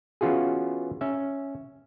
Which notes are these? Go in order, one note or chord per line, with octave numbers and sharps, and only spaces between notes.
E3 B3 C#4 F4 F#4 G#4
C#4 E5